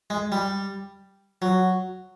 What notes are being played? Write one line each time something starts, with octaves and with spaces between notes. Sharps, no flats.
G#3
G3
F#3